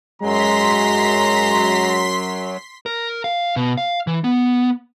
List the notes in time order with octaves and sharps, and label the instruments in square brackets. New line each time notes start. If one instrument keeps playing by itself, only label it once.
[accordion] F#2 F#3 [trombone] G#3 [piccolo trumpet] A#5 [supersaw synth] C6 B6
[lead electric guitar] A#4
F5
B2
F5
E3
B3